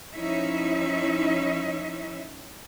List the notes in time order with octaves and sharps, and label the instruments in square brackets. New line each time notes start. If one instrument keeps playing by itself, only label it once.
[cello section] F3 C#4 D#4 E4 E5